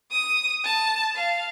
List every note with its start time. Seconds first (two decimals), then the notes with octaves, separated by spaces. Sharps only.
0.12 D#6
0.64 A5
1.16 F5